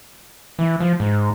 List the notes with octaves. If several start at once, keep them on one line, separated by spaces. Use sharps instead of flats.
E3
F3
G#2